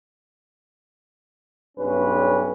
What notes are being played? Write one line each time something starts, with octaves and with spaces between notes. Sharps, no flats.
B1 G2 C#4 B4